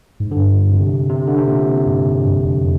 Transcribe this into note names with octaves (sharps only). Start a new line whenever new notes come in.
G#2
G2 D3
C3
C3
D3
C3
A#2
G#2
G#2
G2
F2